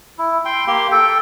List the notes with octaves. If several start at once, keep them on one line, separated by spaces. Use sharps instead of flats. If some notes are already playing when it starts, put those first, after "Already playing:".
E4
G5 C6
A#3 G4 C6
A4 G5